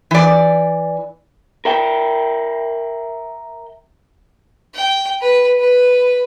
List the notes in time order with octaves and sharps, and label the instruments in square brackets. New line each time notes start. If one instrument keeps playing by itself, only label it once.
[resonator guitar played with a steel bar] E3 D5
[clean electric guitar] A#4 E5 G5
[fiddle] G5
B4
B4